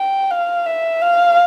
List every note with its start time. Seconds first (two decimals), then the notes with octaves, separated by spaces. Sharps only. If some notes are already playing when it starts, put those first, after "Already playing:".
Already playing: G5
0.31 F5
0.66 E5
1.01 F5